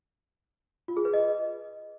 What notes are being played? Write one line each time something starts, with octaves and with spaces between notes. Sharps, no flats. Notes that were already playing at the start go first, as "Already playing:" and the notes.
F4
G#4
B4
D#5